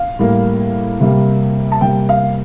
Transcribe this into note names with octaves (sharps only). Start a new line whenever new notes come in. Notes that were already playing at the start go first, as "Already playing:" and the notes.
Already playing: F5
A2 G3 A#3
C3 G3 A#3
A5
C3 G3 A#3 G5
F5